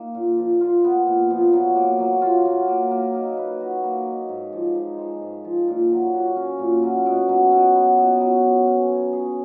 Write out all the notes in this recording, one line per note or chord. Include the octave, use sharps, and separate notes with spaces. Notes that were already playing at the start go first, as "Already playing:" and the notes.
Already playing: A#3 D#4
A#2
F3
F4
B3
A#2
F3
F#3
A#3
F#3
F4
F#3
A#3
A#3
D#4
B4
F#4
A#3
D#4
G#2
F3
D#4
G#3
G#2
F3
A#2
F#3
F#4
C#4
A#2
F#3
B2
F#3
B2
B3
B2
F#3
F#3
C#4
C#5
G#4